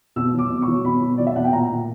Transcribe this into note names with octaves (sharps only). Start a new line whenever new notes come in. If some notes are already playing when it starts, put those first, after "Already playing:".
B2 E6
F#3
D6
B2
C#6
F#3
B2 B5
B2
F#3 D5
E5
B2 F#5
G5
A#2 A#5
A#2